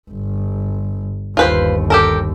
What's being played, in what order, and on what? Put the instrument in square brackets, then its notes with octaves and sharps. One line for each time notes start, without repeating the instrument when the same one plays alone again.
[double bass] G1
[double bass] G1 D#2 [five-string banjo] F4 B4 C5
[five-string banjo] G4 A4 A#4